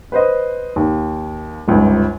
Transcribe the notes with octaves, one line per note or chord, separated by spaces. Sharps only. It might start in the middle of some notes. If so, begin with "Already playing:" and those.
B4 C5 D#5
D#2
G1 C#2 G#2